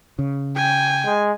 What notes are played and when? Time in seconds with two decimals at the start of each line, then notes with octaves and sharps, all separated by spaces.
0.19 C#3
0.57 G5 G#5
1.05 G#3